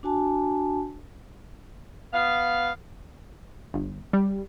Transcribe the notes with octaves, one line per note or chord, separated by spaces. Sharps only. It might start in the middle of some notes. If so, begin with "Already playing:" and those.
D4 F#4 G#5 A5
B3 F5
G1
G3